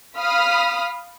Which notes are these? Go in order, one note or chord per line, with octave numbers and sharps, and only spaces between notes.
F5 B5 D#6 F6 B6